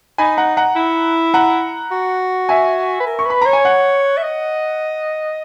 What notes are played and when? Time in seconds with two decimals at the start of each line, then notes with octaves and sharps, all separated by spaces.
0.18 D#4 G#5 B5
0.37 F#5 A#5
0.57 F#5 A#5
0.76 E4
1.34 F#5 A#5
1.91 F#4
2.49 E5 G#5
3.00 B4
3.07 A#4
3.19 C#6
3.26 B4 B5
3.41 C#5 A#5
3.53 G#5
3.65 F#5
4.17 E5
4.23 D#5